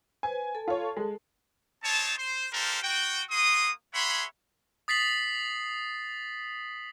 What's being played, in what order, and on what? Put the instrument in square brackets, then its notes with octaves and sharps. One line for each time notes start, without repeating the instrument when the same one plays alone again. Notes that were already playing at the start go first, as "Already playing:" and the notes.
[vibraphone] B4 C5 [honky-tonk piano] G#5
[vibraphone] A4 A5
[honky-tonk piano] F4 C#5
G#3
[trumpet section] C4 D#4 C5 C#5 A5
C5
D4 F4 G4 A4 A#4 C5
F#4 G5
A#3 F#4 C6 D#6
G#4 C#5 E5 F#5 B5 C6
[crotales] D#6 A6 B6 C7 F#7